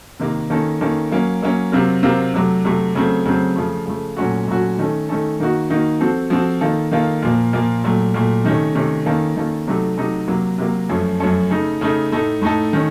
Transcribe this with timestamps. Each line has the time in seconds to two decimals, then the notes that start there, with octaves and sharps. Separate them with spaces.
0.20 C3 D#3 A#3
0.50 D#3 A#3 C#4 A4
0.81 D#3 A#3 C#4 A4
1.11 F#3 A#3 C#4
1.42 F#3 A#3 C#4
1.72 C3 F#3 C4 F4 A#4
2.03 C3 F#3 C4 F4 A#4
2.34 C3 F#3 A3
2.64 C3 F#3 A3
2.95 C#3 F#3 A3 C4
3.25 C#3 F#3 A3 C4
3.56 C#3 F3 A3
3.86 C#3 F3 A3
4.17 A#2 F#3 A3 C#4 F#4
4.47 A#2 F#3 A3 C#4 F#4
4.78 D#3 A3 C#4 A4
5.09 D#3 A3 C#4 A4
5.40 D#3 A#3 D#4 F#4
5.70 D#3 A#3 D#4 F#4
6.01 F3 C4 F#4 A4
6.30 F3 C4 F#4 A4
6.61 D#3 A#3 F4 A4
6.91 D#3 A#3 F4 A4
7.22 A#2 F3 A#3
7.53 A#2 F3 A#3
7.84 A#2 F#3 A3
8.14 A#2 F#3 A3
8.44 C3 D#3 A3 C#4
8.75 C3 D#3 A3 C#4
9.06 D#3 A#3 C#4 F4 A4
9.36 D#3 A#3 C#4 F4 A4
9.67 C3 F#3 A3 D#4 A4
9.97 C3 F#3 A3 D#4 A4
10.28 C3 F#3 A#3
10.58 C3 F#3 A#3
10.89 F#2 F3 A3 C#4 A4
11.20 F#2 F3 A3 C#4 A4
11.50 C#3 A3 D#4 A4
11.81 C#3 A3 D#4 A4
12.12 A2 A3 D#4 A4
12.41 A2 A3 D#4 A4
12.73 D#3 A3 C#4